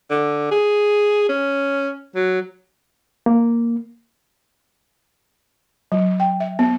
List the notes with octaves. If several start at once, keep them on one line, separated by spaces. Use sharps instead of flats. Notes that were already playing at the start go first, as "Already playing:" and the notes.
D3
G#4
C#4
F#3
A#3
F#3
G5
E5
B3